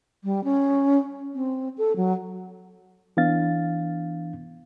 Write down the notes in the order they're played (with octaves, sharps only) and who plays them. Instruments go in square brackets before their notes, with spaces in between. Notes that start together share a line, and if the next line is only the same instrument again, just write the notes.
[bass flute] G3
C#4
C4
A4
F#3
[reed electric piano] E3 B3 D4 F5 A6